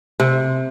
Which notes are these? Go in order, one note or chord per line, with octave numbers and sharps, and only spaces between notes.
C3